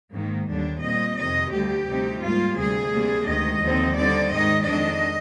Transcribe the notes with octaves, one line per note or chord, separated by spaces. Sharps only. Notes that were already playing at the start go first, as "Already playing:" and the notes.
G#2 D#3 A#3
D#2 D3 G3 D4
A#2 G3 C4 D#5
F2 C3 D#3 D#5
D2 D3 G3 G4
D2 C3 G3 C4 D#4
G#2 G3 A#3 F4
D2 C3 G3 G#4
C3 G3 A#3 D4
D2 C3 D#3 G#3 D#5
D#2 D3 F3 C4 D#4
D3 G3 C4 D#4 D5
G#2 D#3 G#3 D#4 D#5
F2 D#3 G#3 D4 D#5